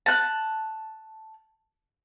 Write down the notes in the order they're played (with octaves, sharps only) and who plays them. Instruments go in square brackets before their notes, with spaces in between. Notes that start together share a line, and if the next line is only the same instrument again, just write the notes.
[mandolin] A5 F#6